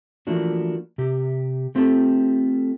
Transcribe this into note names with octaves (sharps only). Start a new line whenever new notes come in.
E3 F3 A3 A#3 D4 F#4
C3 G4
A3 C4 F4 G4 A4